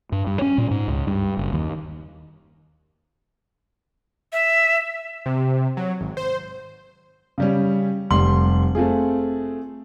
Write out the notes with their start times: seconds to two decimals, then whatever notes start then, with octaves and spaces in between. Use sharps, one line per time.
0.12 G2
0.27 G2
0.42 C#4
0.58 A#2
0.71 G#2
0.88 C#2
1.07 G2
1.37 F#1
1.53 D#2
4.32 E5
5.26 C3
5.77 F#3
6.01 G#1
6.17 C5
7.38 C#3 G3 C#4
8.11 F1 G3 C6 F#7
8.75 A3 C4 F4 G#4